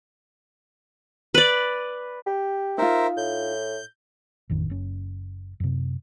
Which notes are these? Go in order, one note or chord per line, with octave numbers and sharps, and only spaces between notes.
B4 D5
G4
D#4 F4 A#4 C5 E5
A2 G6
A1 F2 D#3
F#1 C#4
F#2 C3